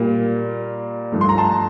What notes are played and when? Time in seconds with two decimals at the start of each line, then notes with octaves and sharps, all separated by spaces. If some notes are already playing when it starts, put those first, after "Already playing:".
Already playing: A#2 G3 A#3
1.12 G2 F3 A3
1.21 C6
1.29 A#5
1.38 A5 C6